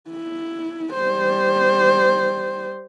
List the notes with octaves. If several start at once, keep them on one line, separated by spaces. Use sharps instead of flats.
E4
G3 C5